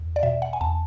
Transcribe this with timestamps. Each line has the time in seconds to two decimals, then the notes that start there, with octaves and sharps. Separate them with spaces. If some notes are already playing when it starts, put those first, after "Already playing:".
Already playing: E2
0.16 D5
0.23 B2 E5
0.42 F#5
0.53 G#5
0.61 E2 A5